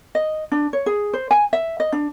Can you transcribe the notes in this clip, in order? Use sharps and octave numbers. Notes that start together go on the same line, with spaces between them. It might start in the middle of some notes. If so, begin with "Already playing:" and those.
D#5
D4
C#5
G#4
C5
G#5
E5
D#5
D4